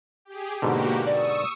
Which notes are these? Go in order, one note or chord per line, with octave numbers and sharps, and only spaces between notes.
G4 G#4
G#2 B2 D3 A#3 F#4 G4
D5 C#6 D#6 E6